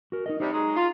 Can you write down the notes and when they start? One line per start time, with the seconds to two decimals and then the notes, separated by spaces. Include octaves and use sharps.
0.12 F#4 A#4
0.26 D#4 A#4 D#5
0.40 C3 G3 D#4
0.54 F#3 G#3 A#5
0.76 F4